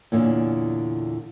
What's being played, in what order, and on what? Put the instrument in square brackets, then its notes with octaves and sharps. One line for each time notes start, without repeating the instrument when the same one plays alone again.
[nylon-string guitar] E2 A#2 D3 C#4